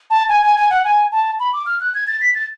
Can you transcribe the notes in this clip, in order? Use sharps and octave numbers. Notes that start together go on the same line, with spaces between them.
A5
G#5
G#5
G#5
F#5
G#5
A5
B5
D6
F6
F#6
G#6
A6
B6
A6